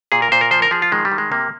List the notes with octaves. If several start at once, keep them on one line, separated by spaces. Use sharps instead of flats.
A#2 G#4
A#4
A#2 C5
A#4
F3 C5
A#4
F3 G#4
F4
D#3 G#3
G3
D#3
G#3
C3 A#3